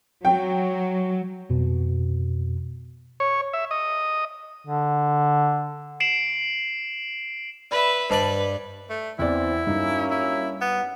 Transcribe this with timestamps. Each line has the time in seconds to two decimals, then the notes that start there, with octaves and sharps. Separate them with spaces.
0.25 F#3 G5
1.50 F2 B2
3.20 C#5
3.53 E5
3.71 D#5
4.67 D3
6.00 C7 D7 E7 F#7
7.71 B4 D5 E5 B5
8.10 G2 B4 C5 D5 D#5 A5
8.90 A3
9.19 E2 E3 C4 E4 D5
9.67 G2 F#3 A#3 C#4 D#4
10.11 E4
10.61 B3